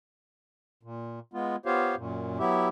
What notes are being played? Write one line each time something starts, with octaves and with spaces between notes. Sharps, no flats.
A#2
G#3 B3 F4
B3 F4 G4 C5 C#5 F5
F#2 A#2
F#3 B3 E4 G4 E5